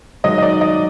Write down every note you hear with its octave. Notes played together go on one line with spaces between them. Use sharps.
G#2 D#3 F#3 D#5
D#5
D5
D#5